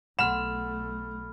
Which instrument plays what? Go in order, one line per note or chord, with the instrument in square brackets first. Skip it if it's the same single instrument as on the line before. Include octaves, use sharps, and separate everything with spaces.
[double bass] B1 A3 [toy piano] F#5 C6 [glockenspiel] B5 F6 [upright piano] E7